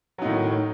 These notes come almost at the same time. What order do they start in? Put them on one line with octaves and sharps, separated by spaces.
F#3 D#4 A2 D#3